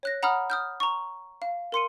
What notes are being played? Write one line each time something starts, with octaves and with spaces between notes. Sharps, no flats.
C#5 F#6 A#6
F#5 A#5 B5 D#6 F6
D#6 F6 G6
A#5 C#6
F5
A#4 C6 C#7 D#7